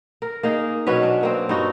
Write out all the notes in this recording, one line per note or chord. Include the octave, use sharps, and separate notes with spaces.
A#4
A#3 D#4 G#4
B2 F#3 C#4 B4
D4
F#3 A#3 C4
G2 D#4 F#4